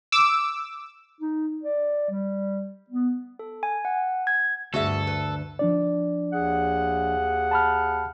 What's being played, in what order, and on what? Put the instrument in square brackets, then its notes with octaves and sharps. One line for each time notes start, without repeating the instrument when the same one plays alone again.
[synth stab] D6 E6
[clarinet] D#4
D5
G3
B3
[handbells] A4
G#5
F#5
G#6
[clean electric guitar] D2 [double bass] G2 [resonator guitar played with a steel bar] F#4 G#4 E5 [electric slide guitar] A4
[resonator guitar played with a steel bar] B4
[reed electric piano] F3 D4 D5
[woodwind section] D#2 G#4 F#5
[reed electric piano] A5 B5 F6